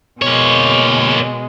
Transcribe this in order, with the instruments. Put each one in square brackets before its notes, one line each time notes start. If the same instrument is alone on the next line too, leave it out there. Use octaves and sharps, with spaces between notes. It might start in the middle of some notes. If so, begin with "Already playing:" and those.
[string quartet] B2 G#3 [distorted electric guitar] A#3 C#5